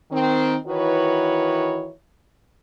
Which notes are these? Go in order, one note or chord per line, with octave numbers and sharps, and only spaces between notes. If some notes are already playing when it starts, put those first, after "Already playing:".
D#3 C4
D#3 E3 E4 F#4 B4 C#5